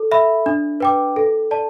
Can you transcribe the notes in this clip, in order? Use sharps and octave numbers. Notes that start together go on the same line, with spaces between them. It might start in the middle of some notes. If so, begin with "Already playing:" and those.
Already playing: A4
E5 B5
D4
B4 G5 D6
A4
D5 A5